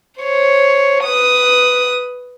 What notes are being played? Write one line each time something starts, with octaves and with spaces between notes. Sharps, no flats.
C5 C#5
B4 D#6